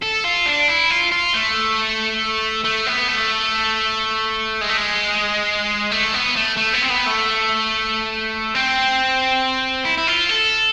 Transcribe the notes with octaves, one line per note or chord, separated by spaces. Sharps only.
A4
F4
D4
E4
F4
F4
A3
A3
B3
A3
G#3
A3
G#3
A3
B3
A3
A3
B3
C4
B3
A3
C4
E4
E4
F4
A4